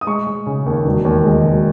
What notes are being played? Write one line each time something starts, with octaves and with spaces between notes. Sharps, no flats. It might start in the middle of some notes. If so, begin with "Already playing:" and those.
D#6
G#3 C#6
G#3
C#3
D#2
E1
D#2
G#3
E1